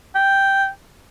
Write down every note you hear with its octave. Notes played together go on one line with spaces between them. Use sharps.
G5